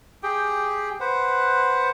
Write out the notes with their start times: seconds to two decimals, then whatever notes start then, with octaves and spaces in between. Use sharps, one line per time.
0.23 G4 G#4 G5
1.00 B4 C5 F#5